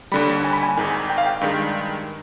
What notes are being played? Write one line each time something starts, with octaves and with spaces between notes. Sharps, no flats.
D#2 D3 G3 B5
G#5
B5
G#5
G#1 G#2 D#3 G#5
G5
F5
G5
G2 D#3 G#3